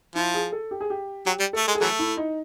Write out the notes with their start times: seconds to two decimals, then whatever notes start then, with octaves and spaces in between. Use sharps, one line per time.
0.15 F3 E4
0.34 G#4
0.52 A4
0.71 G4
0.81 G#4
0.90 G4
1.26 F#3 G4
1.40 G3
1.53 A3 A4
1.68 G#3
1.75 G#4
1.81 E3 F#3 A3 A4
1.99 E4
2.17 D#4